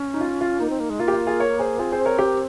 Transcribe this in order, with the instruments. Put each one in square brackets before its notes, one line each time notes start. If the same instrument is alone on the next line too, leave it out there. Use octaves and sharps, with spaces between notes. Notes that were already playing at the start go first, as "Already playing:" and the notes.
Already playing: [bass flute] C#4
[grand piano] D#4
F4
F4
[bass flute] A#3 [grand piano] D#4
[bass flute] C4
A#3
G#3
[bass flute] A#3 [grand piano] F4
[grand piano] G4
F4
F4 G#4
A#4 C#5
G#4 C5
[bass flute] C4 [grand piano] F4 G#4
[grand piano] G#4 C5
A#4 C#5
G4 A#4